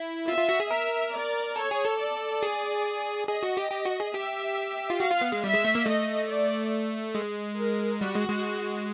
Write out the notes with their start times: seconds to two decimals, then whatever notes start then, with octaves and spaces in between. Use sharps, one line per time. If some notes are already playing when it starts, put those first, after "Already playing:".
Already playing: E4
0.28 F4 E5
0.38 F4
0.49 F#4
0.60 G#4
0.71 A#4 E5
1.13 D5
1.56 A4 C#5
1.71 G#4
1.85 A4
1.99 D5
2.43 G#4
3.28 G#4 D#5
3.43 F#4
3.57 G4
3.71 G4
3.85 F#4
4.00 G#4
4.14 G4 E5
4.90 F4
5.00 F#4 F5
5.11 F4
5.21 B3
5.32 G#3
5.43 G3 E5
5.54 G#3
5.64 A3
5.75 A#3
5.86 A3 D#5
6.29 D5
7.15 G#3
7.58 A#4
8.01 G3 F#4
8.15 G#3
8.29 G#3